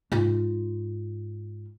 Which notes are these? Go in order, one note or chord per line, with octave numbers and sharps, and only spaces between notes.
G#2 F4